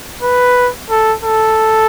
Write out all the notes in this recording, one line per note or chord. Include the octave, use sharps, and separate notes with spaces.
B4
A4
A4